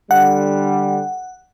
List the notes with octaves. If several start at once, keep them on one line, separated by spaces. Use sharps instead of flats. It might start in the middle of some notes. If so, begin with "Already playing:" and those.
D3 G3 F#5